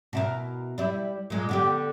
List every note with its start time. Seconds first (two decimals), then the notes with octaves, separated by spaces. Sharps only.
0.13 B2 E4 A#4
0.78 G3 E4
1.30 A#2 G#3
1.49 D3 B3 G4